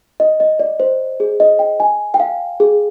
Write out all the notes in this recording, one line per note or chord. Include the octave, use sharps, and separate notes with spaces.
D#5
D#5
D5
C5
G#4
D#5
G5
G#5
G5
F5
G#4